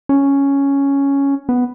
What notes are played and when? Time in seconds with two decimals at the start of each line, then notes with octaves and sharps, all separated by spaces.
0.09 C#4
1.49 B3